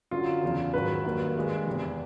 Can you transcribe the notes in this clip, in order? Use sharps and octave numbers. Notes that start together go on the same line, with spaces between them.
F#2 D3 F#3 F4
E2 C#3 F3
G#2 D#3 F#3 B4
G2 D#3 F#3 A#3
G2 D#3 G#3
E2 C3 E3